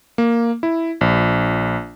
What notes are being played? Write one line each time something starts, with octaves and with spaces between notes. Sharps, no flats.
A#3
E4
A#1